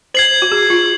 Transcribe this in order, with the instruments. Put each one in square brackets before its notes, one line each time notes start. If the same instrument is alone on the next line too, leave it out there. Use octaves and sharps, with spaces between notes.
[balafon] C5 [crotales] G#6 C7 F#7
[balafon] F#4
G#4
F4